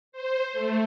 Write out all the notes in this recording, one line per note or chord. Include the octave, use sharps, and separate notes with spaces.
C5
A3